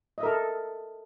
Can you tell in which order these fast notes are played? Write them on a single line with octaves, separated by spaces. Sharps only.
D#5 E5 A#4 A4